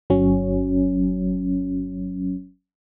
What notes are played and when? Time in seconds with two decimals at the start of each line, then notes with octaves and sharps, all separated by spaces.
0.10 G1 F#3 C#4